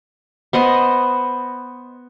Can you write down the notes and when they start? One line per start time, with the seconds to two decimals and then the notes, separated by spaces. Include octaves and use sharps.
0.53 B3 C5 D#5